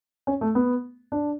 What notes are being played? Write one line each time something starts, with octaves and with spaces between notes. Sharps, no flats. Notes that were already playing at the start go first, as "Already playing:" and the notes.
C#4
A3
B3
D4